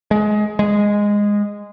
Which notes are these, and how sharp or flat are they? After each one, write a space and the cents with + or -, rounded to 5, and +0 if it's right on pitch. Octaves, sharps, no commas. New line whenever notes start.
G#3 +20
G#3 -10